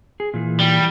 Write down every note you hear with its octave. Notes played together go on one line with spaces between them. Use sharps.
G#4
A#2 E3
G3